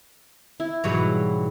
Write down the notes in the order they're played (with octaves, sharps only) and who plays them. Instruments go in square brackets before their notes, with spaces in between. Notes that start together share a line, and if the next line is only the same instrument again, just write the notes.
[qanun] E4
[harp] G#2 B2 A#5 [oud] E3 F#3 G3